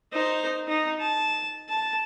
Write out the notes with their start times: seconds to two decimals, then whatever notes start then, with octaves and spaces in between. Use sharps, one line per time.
0.12 D#4 C5
0.68 D#4
1.00 A5
1.69 A5